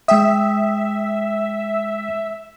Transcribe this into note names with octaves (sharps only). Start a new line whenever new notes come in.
G#3 E5 G5 D#6